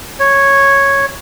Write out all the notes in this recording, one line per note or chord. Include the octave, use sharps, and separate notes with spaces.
C#5